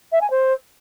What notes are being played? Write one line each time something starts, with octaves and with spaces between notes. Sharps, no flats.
E5
G#5
C5